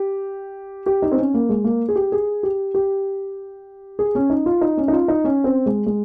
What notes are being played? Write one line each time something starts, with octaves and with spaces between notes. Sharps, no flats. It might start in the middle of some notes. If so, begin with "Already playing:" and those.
Already playing: G4
G4
D#4
C4
C#4
A#3
G#3
A#3
G#4
G4
G#4
G4
G4
G#4
C#4
D#4
F4
D#4
C#4
D#4
F4
D#4
C#4
C4
G#3
G#3